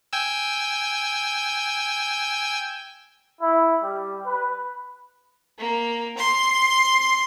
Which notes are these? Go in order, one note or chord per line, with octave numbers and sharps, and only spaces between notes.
G5 G#5 E6
E4
G3
B4
A#3
C6